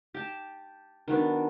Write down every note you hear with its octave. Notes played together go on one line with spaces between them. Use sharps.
G4 A5
D#3 F#3 B3 D4